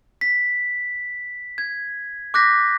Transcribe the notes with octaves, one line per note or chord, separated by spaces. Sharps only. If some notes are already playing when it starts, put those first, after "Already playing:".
B6
G#6
D6 F#6 G6 A#6 B6